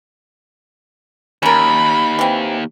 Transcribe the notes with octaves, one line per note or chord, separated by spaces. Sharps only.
D#2 C#4 A#4 B5
E3 C4